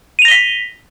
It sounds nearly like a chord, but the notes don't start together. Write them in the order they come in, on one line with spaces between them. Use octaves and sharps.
D#7 F7 A#6 G7 B6